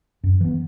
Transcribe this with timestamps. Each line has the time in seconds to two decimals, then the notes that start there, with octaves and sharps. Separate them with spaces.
0.24 F#2
0.41 E3 B3